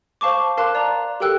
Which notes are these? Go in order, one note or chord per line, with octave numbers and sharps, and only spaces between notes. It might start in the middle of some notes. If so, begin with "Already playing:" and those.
C5 F5 A5 C#6 D6
A#4 F5 A5 C6 D6 F#6
D5 A#5
G4 A4 A#4 G5 E6 F#6